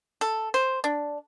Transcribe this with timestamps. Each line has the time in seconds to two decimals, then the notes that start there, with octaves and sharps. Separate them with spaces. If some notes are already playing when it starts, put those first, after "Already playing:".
0.21 A4
0.54 C5
0.84 D4